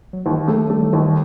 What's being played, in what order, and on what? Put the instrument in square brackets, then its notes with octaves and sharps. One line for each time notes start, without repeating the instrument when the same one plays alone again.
[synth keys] F#3
[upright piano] D#2 [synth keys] E3
[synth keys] D#3 F#3 [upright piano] A3
[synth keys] F#3
[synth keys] E3 G3 [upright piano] A3
[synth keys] D#3 F#3
[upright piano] D#2 [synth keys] D#3 F#3
[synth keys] E3